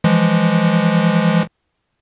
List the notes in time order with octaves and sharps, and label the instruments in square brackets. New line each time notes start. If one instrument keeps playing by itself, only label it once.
[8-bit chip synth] E3 F3 G#3